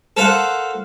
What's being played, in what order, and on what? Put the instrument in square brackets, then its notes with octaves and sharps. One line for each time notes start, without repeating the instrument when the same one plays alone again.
[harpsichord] A4 A#4 C5 F5 F#5